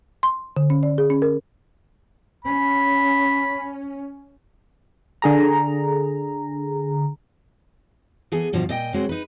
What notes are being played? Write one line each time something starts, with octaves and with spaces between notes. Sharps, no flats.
C6
D3
C#4
D5
G#4
C#4
A#4
C#4 B5
D3 G#4 A#5
E3 B3 G#4 A4 G#5
G2 B2 D3 F3
A#2 D#5 G5
C3 F#3 G#3 C4 F#4
D#4 B4